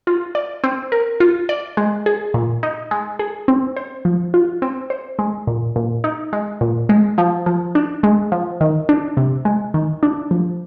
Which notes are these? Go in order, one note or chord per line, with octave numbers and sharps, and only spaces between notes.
F4
D5
C4
A#4
F4
D5
G#3
G#4
A#2
D#4
G#3
G#4
C4
C5
F3
F4
C4
C5
G#3
A#2
A#2
D#4
G#3
A#2
G#3
F3
F3
D4
G#3
F3
D#3
D4
C3
G#3
D#3
D4
F3